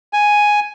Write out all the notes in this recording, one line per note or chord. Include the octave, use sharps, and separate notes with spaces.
G#5